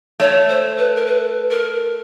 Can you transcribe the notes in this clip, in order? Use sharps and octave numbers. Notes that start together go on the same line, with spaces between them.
A3 C#5
C5
B4
A#4
B4
A#4